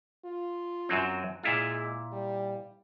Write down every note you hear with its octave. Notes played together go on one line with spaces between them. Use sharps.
F4
F#2 F#3 C4
A#2 G#3 E4 F4
G3